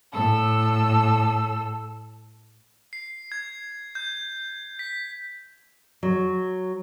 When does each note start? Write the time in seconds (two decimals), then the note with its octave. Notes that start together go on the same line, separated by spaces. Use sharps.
0.12 A2 A4 E6
2.93 C7
3.32 G#6
3.95 G6
4.79 B6
6.03 F#3